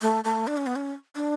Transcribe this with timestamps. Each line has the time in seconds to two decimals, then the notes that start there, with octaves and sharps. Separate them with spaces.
0.02 A3
0.24 A3
0.47 D4
0.57 C#4
0.66 B3
0.76 C#4
1.16 D4